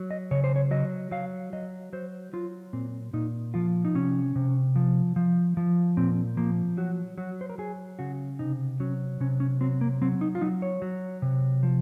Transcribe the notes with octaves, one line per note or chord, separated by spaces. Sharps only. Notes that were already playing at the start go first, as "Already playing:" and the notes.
Already playing: F#3
D#5
C#3 C#5
C5
C#5
F#3 D#5
F#3 F5
F#3 D#5
F#3 C5
F#3 F4
A#2 C4
A#2 D#4
F3 F4
D#4
C3 C#4
C3
F3
F3
F3
A#2 C4
F3 A#3
F#3 F#4
F#3 F#4
C5
A#4
F#3 G#4
C#3 F#4
C3 D#4
F#3 C#4
C3 C#4
C#4
F#3 C4
A#3
F#3 C4
D#4
F4
F#3 D#4
C#5
F#3
C3
F3